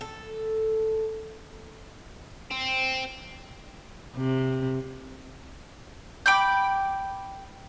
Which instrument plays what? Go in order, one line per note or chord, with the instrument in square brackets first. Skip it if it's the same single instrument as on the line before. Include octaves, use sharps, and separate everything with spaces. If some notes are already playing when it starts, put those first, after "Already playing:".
[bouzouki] A4
[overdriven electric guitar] C4
[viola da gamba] C3
[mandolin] G5 B5 D6 G6